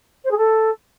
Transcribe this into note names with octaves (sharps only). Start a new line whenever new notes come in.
C5
G#4
A4